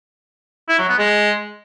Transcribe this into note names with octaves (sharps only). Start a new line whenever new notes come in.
E4
F#3
B3
G#3